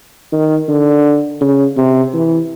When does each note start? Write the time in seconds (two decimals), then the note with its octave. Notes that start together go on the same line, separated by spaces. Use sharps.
0.32 D#3
0.68 D3
1.41 C#3
1.77 C3
2.14 E3